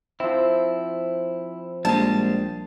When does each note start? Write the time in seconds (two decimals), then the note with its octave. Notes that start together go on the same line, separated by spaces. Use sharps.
0.20 F3 C4 E4
1.85 A#1 G3 G#3 A5